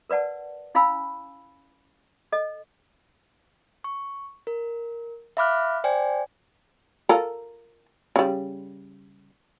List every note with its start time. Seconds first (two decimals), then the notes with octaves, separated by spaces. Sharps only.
0.10 A#4 B4 D5 F#5 A5
0.75 C#4 E4 F5 G#5 B5 E6
2.32 A4 D#5
3.84 C#6
4.47 A#4
5.37 E5 F5 B5 D6 F6 F#6
5.84 C5 D5 G5 G#5
7.09 F4 A4 A#4
8.16 C#3 G3